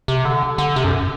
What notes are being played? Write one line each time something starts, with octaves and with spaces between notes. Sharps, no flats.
C3
D3
D3
C3
F#2